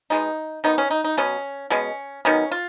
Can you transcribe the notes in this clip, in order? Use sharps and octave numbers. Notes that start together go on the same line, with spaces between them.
B2 G#3 B3 D#4
D#3 F#3 B3 D#4
C#4
D#4
D#4
B2 F#3 B3 C#4
B2 G#3 B3 C#4
D#3 F#3 B3 C#4
F4